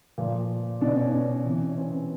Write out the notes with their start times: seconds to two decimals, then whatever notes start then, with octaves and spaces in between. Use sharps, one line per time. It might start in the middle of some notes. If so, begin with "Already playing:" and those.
0.18 A#2 F3
0.81 B2 D4
0.97 C#4
1.05 D4
1.12 C#4
1.45 C3 E3
1.69 C#4
1.77 C4